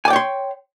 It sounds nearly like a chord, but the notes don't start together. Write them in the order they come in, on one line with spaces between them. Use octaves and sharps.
G#5 D5 G5 C#5 C6